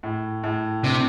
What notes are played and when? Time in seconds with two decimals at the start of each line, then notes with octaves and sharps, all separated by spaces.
0.03 A2
0.44 A2
0.83 C3 D4